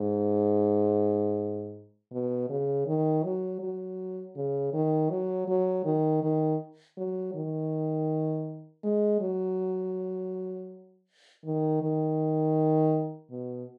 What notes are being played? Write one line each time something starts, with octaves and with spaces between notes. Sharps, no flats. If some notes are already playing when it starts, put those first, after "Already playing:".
Already playing: G#2
B2
C#3
D#3
F#3
F#3
C#3
D#3
F#3
F#3
D#3
D#3
F#3
D#3
G#3
F#3
D#3
D#3
B2